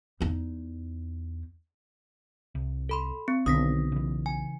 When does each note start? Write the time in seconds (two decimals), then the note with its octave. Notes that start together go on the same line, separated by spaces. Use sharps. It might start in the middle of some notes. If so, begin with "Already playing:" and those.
0.21 E2 D#4
2.55 C2
2.89 A4 B5 C6
3.28 C4
3.46 B1 D3 D#3 C4 D#6 A#6 B6
3.92 C#3 E3
4.26 G#5